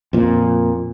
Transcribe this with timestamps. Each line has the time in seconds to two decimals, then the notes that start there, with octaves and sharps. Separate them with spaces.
0.13 F2 A#2